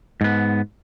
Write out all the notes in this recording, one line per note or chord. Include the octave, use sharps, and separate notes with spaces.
G#2 B3